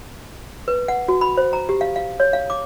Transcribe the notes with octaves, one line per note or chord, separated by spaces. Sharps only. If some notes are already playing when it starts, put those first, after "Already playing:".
B4
F#5
F#4
B5
C5
A#5
G4
F5
F5
C#5
F5
D6